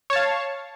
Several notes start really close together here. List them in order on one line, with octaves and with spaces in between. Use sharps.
C#5 A5 F5